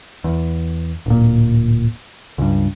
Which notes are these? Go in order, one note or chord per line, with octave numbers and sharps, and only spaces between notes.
E2
D1 A#2
C#2 G2